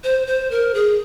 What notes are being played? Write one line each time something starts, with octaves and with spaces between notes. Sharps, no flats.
C5
C5
A#4
G#4